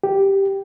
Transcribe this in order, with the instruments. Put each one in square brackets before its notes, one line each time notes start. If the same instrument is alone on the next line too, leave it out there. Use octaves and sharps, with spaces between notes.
[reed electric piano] G4